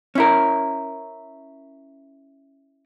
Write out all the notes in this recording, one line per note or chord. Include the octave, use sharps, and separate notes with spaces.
C#4 E4 A#4